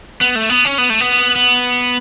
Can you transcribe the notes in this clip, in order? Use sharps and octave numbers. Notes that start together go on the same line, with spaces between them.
B3
A3
B3
C#4
B3
A3
B3
B3